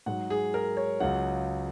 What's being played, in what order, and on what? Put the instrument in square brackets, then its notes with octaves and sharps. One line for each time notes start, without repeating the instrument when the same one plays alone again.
[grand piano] G#2 F#3 F#5
G#4
A#4
C#5
C#2 C#3 F#3 F#5